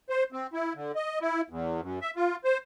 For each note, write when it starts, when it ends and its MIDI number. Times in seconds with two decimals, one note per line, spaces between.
0.10 0.23 72
0.32 0.47 60
0.53 0.73 64
0.75 0.92 50
0.95 1.19 75
1.21 1.41 64
1.50 1.81 40
1.82 1.99 42
2.02 2.10 76
2.16 2.36 65
2.44 2.58 72